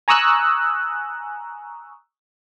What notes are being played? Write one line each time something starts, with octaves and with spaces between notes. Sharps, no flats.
G#5 A#5 C#6 D#6 E6 F#6